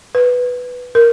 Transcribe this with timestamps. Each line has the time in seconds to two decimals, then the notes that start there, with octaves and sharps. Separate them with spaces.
0.15 B4
0.95 A#4